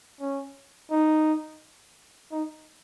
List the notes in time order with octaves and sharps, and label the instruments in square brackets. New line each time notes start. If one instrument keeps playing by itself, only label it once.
[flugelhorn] C#4
D#4
D#4